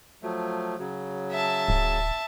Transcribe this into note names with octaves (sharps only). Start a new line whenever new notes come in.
F3 F#3 A3
C#3 F#3
E5 A5
D1